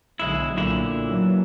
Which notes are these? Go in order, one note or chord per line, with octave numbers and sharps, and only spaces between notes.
B1 D3 F#3 G#3 E4
B1 A#2 D3 E4
E3 F#3 A#3